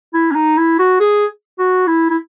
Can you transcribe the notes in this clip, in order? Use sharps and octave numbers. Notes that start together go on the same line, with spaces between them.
E4
C#4
D#4
E4
F#4
G#4
F#4
E4
E4